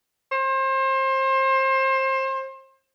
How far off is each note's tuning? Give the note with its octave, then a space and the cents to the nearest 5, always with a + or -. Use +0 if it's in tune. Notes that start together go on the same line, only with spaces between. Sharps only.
C5 +30